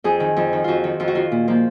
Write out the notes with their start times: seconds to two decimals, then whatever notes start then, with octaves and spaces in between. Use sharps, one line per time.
0.04 F2 G#4
0.20 D#3
0.36 F2
0.53 D#3
0.64 F2 F4 F#4
0.84 D#3
1.00 F2 F4
1.08 F#4
1.15 D#3 F4
1.32 A#2
1.48 F3 A#3